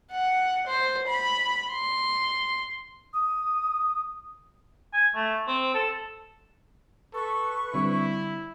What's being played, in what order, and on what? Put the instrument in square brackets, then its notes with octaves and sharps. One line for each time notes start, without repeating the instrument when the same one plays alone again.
[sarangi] F#5
C5
B5
C6
[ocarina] D#6
[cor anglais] G#5
A3
C4
A4
[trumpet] A4 [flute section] B4 C#6
[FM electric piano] D3 G3 C4 [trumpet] E4